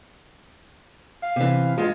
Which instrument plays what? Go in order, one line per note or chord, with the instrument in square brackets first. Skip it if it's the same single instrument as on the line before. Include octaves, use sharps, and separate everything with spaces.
[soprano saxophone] F5
[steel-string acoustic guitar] C3 E3
[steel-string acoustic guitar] G2 G#3 [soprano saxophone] F4